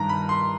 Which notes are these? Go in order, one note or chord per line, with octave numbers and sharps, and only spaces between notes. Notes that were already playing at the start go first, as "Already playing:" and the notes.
Already playing: G2 D#3 A#5
B5
C6